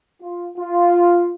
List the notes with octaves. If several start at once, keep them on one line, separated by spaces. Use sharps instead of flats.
F4
F4